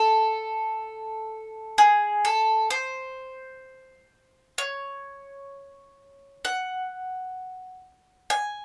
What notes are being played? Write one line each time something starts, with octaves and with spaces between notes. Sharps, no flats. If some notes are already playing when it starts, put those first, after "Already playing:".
Already playing: A4
G#4
A4
C5
C#5
F#5
G#5